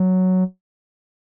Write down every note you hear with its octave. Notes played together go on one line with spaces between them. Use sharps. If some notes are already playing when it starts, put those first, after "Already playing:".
Already playing: F#3